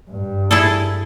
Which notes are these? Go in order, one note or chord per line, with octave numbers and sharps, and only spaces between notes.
G2
E4 G#4 A4